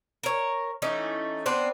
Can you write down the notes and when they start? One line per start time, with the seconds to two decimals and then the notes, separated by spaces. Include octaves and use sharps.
0.23 A#4 C#5
0.82 E3 A3 C#4 D#4
1.46 B3 C4 D4 B4